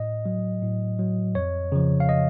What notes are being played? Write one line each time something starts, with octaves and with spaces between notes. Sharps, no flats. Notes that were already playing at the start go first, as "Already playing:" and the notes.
Already playing: A2 D#5
F#3
A2
F#3
F2 C#5
C#3 F3
F5
D#5